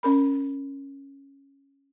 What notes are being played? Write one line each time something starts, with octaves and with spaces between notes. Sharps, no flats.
C#4 A#4 B5